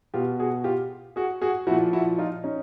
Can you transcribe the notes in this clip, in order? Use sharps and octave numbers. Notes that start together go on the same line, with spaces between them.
B2 F4 G4
F#4 G#4
F4 G4
F#4 G#4
F#4 G#4
A#2 F3 E4 F#4
E4 F#4
D#4 F4
C#4 D#4